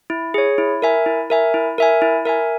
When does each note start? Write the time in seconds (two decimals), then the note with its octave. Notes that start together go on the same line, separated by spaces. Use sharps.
0.10 E4
0.34 G#4 C#5
0.58 E4
0.82 A#4 E5 G#5
1.06 E4
1.30 A#4 E5 G#5
1.54 E4
1.78 A#4 E5 G#5
2.02 E4
2.25 A#4 E5 G#5